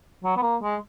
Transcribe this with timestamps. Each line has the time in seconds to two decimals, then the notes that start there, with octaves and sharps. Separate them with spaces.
0.24 F#3
0.37 B3
0.42 A#3
0.62 G#3